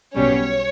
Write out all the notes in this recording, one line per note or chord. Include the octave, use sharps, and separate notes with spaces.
B1 B2 G3 C#4 C#5